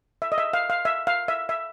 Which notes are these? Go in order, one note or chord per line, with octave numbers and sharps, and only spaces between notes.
E5
D#5
E5
F5
F5
E5
F5
E5
E5